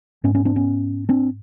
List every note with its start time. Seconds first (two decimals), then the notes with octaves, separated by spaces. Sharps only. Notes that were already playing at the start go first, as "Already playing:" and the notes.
0.24 G#2 B3 C#4
0.35 B3 C#4
0.45 C4 D4
0.56 B3 C#4
1.09 C4 D4